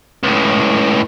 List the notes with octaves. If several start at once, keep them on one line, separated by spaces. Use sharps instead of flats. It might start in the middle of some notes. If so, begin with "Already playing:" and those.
C#2 A2